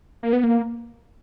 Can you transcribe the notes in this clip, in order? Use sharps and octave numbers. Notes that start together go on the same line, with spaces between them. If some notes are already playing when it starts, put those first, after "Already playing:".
A#3
B3
A#3